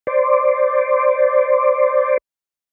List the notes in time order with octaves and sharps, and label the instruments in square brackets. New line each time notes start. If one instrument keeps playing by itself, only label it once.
[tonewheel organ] C5 D5